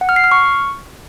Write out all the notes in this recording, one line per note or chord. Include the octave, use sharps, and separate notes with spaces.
F#5
F6
C7
F6
C#6